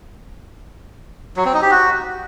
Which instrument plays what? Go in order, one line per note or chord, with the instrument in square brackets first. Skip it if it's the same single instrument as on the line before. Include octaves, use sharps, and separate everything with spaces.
[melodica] F#3
C4
D#4
G4
F#4